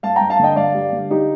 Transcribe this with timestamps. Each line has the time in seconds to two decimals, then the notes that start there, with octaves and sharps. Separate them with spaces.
0.03 G2 F5 A5
0.16 G5 A#5
0.21 G2
0.30 F5 A5
0.39 D3 D#5 G5
0.56 G2 D5 F5
0.74 G3
0.92 D3
1.10 G3 D#4 G4